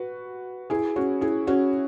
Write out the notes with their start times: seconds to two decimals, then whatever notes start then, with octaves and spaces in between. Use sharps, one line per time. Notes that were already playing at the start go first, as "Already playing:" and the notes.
Already playing: F#4 B4
0.70 E4 G#4
0.96 C#4 F#4
1.21 E4 G#4
1.47 C#4 F#4